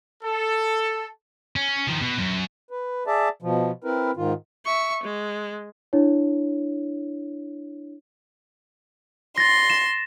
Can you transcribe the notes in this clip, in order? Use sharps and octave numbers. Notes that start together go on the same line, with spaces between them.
A4
C#4
D#3 F3
B2
F#2
B4
G#4 D5 E5 A5
B2 F3
C4 E4 A#4 B4
G#2 D#3 F4
E5 C#6
G#3
D4 E4 C#5
C6 A6 A#6
E7